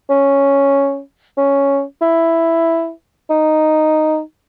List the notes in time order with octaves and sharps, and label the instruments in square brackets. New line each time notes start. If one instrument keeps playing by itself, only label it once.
[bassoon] C#4
C#4
E4
D#4